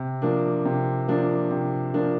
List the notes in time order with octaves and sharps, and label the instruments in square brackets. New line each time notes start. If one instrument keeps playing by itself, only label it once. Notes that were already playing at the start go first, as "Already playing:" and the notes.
Already playing: [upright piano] C3
F3 A#3 D4
C3
F3 A#3 D4
C3
F3 A#3 D4